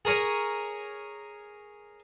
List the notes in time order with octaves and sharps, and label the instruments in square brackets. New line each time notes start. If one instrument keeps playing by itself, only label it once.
[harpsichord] G#4 A#4 C#5 G#5